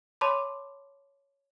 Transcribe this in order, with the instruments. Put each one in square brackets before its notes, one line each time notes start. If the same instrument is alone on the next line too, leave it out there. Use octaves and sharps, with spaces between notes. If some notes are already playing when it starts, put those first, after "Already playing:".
[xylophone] C#5 A5 B5 C6 D6